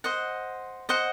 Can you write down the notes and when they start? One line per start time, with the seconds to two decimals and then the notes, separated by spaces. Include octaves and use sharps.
0.04 C5 D#5 F#5
0.89 C5 D#5 F#5